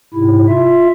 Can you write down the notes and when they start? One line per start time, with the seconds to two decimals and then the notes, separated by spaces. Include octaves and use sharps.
0.14 G#2 C3 E4
0.49 F4 E5